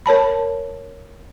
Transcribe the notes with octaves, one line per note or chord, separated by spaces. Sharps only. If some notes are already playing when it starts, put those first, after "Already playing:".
A#4 C#5 A5 B5